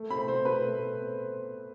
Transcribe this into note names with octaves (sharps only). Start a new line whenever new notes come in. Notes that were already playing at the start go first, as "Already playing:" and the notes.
Already playing: A3
C4 B5
B2 C5
B2 B4
A3
C4